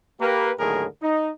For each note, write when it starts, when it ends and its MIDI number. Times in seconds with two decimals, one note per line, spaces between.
0.20 0.52 58
0.20 0.52 67
0.20 0.52 71
0.59 0.86 39
0.59 0.86 45
0.59 0.86 50
0.59 0.86 54
0.59 0.86 68
0.59 0.86 70
1.02 1.30 63